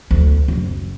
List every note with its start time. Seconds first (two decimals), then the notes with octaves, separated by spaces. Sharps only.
0.11 D2
0.48 F#1